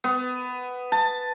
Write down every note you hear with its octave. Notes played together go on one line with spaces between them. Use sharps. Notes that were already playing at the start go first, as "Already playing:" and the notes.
B3
A5